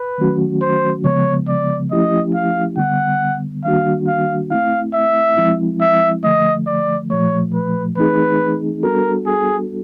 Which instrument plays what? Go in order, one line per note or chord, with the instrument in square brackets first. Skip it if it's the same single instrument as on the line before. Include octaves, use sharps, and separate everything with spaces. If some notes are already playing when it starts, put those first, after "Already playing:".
Already playing: [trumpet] B4
[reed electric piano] D#3 F#3 A3 C#4 F#4
[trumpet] C5
[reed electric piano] C#3 F3 G#3 B3 [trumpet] C#5
[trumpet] D5
[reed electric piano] F3 A3 C#4 E4 G4 [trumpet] D#5
[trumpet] F5
[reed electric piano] D3 G3 B3 [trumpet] F#5
[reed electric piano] D#3 G3 A#3 D4 F#4 [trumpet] F5
[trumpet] F5
[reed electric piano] A3 C4 E4 [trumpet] F5
[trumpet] E5
[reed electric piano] F3 G#3 C4 E4
[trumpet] E5
[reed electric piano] D3 F3 A3 [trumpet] D#5
[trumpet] D5
[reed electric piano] A#2 F3 A3 [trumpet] C#5
[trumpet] B4
[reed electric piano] E3 A3 C4 D#4 G#4 [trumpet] B4
[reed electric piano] G3 B3 D4 F#4 A4 [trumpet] A#4
[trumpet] G#4